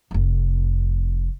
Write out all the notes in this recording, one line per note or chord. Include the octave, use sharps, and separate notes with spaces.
F1 F2